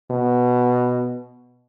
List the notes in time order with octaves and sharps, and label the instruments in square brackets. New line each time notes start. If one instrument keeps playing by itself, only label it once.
[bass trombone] B2